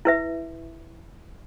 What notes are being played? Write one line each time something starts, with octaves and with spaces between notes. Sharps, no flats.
E4 B4 E5